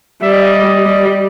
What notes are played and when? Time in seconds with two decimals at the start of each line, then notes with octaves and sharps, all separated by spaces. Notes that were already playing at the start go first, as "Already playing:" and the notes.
0.22 G3 E5
0.32 D#5
0.43 D#5
0.85 G3